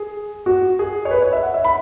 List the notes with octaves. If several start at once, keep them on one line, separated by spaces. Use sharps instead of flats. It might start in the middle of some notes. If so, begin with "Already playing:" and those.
Already playing: G#4
F#4
G#4
C#5
B4
C#5
E5
F#5
E5
B5